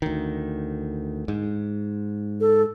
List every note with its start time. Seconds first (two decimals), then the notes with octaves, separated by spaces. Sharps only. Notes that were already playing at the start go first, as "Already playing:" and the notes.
0.02 D2 D#3
1.28 G#2
2.40 A4